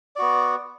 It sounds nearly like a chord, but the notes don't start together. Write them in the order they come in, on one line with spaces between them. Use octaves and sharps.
D5 F#4 B3